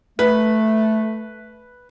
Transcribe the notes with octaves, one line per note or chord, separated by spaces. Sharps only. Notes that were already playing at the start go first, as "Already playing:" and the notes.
A3 B4